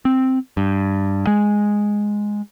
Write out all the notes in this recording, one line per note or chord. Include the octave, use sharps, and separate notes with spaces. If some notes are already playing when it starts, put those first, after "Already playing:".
C4
G2
G#3